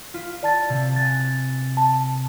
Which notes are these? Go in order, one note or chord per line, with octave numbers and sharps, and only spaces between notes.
F4 B6
D5 A5 A6
C3
G#5 F#6 A6
A5